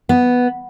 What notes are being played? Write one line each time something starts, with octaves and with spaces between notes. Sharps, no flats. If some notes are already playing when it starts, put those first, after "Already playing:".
B3